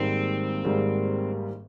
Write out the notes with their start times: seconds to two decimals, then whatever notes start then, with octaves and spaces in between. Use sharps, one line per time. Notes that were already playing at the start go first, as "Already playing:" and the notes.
Already playing: G#1 G#2 D#3 G3 A#3 C4
0.65 G#1 G#2 D#3 G3 A#3